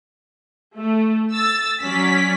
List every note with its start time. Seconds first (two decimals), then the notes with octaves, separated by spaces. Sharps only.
0.77 A3
1.33 E6 A6
1.83 F#3 C#4 D5 B6